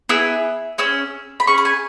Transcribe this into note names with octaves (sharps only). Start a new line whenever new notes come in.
B3 E4 G#4 E6
C#4 G#4 E6
B5
C#4 G#4 C#6
B5
G#5